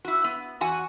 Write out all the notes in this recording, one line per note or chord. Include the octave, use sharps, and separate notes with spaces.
E4 F#4
B3
E2 F#4 F#5 G#5